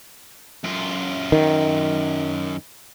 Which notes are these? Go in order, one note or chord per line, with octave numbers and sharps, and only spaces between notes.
F#2 F4
D#3